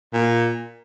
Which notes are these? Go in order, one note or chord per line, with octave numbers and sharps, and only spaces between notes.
A#2